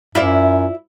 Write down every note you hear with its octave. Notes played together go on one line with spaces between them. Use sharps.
F#2 E4 F4 D5